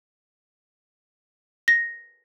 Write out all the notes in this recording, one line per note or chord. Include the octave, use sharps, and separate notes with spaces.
A#6